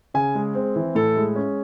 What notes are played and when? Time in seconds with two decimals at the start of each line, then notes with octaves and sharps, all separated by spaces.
0.14 C#3 G#5
0.35 G#3
0.55 C4
0.76 E3
0.95 A2 A4
1.16 G#3
1.36 C#4